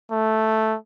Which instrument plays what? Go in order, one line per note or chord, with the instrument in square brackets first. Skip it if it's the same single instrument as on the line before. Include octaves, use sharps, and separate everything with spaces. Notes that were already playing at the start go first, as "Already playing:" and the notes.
[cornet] A3